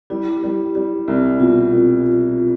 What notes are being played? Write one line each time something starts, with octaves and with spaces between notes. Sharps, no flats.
G3 E4
G3
G3
C2
B2 F4
C2